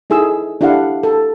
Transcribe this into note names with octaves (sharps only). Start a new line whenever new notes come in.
D#4 E4 G#4 A4 E6
D4 E4 G4 A4 F5 F#5
A4